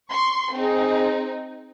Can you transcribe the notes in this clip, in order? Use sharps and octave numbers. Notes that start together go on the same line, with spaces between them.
C6 C#6
C4 D#4 G#4